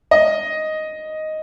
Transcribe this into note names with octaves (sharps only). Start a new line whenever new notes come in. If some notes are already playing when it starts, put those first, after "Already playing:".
D#5